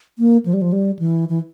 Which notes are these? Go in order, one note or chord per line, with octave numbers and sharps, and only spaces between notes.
A#3
F3
G3
F3
G3
E3
E3